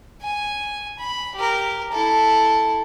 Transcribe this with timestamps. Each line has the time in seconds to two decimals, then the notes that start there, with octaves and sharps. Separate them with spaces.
0.22 G#5
0.99 B5
1.35 G4 A#4
1.92 E4 A4